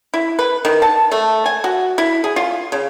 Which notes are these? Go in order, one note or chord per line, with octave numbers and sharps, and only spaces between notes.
E4
B4
D#3
A5
A3
G#5
F#4
E4
G#4
F4
C#3